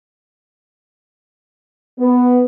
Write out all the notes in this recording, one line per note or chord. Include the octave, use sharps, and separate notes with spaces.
B3